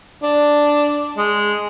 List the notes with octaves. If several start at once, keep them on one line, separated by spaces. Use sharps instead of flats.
D4
G#3